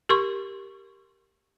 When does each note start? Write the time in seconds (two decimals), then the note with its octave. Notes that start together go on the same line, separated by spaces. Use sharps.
0.09 G4 A#4 C6 C#6